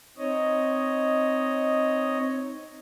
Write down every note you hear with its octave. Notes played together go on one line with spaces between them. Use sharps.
C4 D#4 C#5 D#5